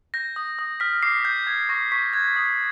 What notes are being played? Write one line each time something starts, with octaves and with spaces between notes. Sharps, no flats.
G6 A#6
D#6
D#6
F6 B6
D6 C7
D6 G6
F6 G#6
C#6 A#6
C#6 B6
F#6 G#6
D#6